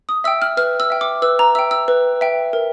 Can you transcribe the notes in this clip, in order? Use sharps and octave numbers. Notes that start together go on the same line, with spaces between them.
D#6
E5 G5 E6
F6
B4 F6
E6
E5 G5
D6
B4 E6
A#5
E5 G5 E6
E6
B4
E5 G5
A#4